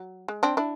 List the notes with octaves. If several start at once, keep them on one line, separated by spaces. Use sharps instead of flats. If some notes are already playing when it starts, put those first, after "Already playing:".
Already playing: F#3
G#3
C4 D4
D4 E4